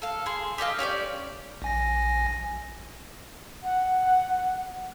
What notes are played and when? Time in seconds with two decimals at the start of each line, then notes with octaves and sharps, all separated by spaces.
0.02 A4 F5
0.26 G#4 C6
0.58 G4 A4 D#5 F5
0.79 C#4 G4 C#5 D5
1.62 A#1 G#5 A#6
3.64 F#5